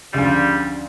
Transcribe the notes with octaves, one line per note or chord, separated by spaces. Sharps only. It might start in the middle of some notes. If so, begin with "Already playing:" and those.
D2 C#3 F3 G3